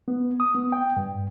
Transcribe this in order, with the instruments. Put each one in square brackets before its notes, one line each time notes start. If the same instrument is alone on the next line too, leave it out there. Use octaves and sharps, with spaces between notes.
[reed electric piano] B3
D#6
B3
G5
G2